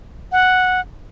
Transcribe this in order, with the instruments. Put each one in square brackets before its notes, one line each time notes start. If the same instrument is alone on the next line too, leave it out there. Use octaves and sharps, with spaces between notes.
[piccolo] F#5